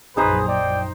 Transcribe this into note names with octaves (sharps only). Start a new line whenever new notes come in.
A#1 F#2 D#4 G#4 B4 C5 A#5
D5 G5